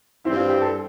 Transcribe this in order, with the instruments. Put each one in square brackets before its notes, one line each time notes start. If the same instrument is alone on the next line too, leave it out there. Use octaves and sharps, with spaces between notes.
[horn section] G2 E3 G3 C4 [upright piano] E4
[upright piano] F4
G4
A4